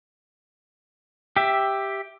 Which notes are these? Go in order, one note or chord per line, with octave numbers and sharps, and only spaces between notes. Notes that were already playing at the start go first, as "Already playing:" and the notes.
G4 E5